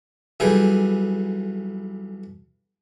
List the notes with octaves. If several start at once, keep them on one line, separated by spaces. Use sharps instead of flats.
B1 E3 G3 G#4 A4 G5